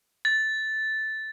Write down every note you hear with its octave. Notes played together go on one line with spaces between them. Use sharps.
A6